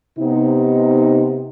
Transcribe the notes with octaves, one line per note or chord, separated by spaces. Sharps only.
C3 B3 D#4